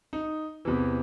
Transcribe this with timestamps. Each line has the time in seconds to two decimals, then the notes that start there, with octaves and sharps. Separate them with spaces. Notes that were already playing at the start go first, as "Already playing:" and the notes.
0.13 D#4
0.65 E2 C3 E3